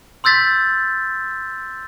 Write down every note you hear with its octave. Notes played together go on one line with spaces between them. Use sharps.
C6 E6 G6 A6 B6